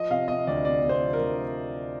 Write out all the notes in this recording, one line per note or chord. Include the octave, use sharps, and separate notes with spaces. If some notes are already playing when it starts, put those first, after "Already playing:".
Already playing: F3 D#5
C3 F5
C3 D#5
D2 D5
C3 D5
C3
C5
F3
A#4
D2